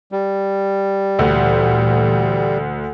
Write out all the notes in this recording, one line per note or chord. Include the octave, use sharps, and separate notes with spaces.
G3
D2 A#2 E3